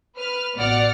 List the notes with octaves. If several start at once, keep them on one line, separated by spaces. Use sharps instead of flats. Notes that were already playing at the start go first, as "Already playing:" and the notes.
B4 F6
A1 B2 D5 F#5 F6